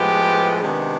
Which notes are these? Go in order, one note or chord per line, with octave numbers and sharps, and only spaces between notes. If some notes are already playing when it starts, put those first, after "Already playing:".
Already playing: A2 F3 G#3 B3 G4
C3 D#3 G#3 B3 D4